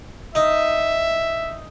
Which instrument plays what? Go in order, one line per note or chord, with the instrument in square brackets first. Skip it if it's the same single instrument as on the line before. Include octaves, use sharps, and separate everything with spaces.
[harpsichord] D#4 [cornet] E5